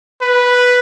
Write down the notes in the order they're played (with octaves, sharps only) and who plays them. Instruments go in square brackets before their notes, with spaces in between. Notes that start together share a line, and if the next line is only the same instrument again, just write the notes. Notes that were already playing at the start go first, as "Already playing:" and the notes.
[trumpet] B4